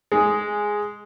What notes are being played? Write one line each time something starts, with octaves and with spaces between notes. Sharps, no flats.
G#3 G#4